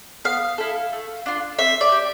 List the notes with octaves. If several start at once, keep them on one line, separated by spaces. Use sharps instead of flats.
B3 F5
E4 A4
A3
D4 F4
C4 E5
D5
G4